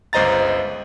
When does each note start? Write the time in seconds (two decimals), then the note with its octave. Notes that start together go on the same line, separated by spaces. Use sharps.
0.13 G1 C#2 C5 D#5 A#5 A6